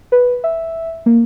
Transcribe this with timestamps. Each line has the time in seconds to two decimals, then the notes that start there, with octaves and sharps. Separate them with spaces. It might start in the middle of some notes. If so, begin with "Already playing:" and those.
0.12 B4
0.44 E5
1.06 A#3